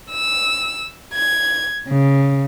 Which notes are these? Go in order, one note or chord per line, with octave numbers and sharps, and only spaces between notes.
E6
G#6
C#3